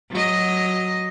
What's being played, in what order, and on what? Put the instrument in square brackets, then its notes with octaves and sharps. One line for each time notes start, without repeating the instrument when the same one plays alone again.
[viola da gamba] F#3 D#5